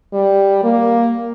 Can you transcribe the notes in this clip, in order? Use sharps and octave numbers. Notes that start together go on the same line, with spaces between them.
G3
A#3